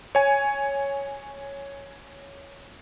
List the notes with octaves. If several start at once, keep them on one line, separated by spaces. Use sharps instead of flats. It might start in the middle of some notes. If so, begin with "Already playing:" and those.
C#5 G#5